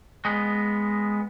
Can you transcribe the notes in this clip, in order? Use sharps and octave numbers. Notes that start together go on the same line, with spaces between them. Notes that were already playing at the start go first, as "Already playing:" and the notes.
G#3 B3